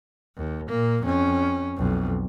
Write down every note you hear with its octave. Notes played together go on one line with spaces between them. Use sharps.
D#2
A#2 A#3
F2 C#4
B1 F2